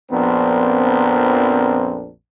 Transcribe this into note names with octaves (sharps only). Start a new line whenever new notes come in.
A#1 F2 B3 C4 D4 A#4